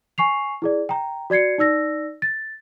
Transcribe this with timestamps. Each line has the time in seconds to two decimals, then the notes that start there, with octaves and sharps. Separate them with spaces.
0.18 G#5 C#6 C7 F7
0.62 E4 G#4 D5
0.89 G5 A#5
1.30 F#4 D5 G#6 C7 C#7
1.58 D#4 D5 E6 A#6
2.22 A6